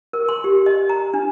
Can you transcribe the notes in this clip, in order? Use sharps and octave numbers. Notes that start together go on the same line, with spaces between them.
A#4
C6
G4
D#5
A#5
D4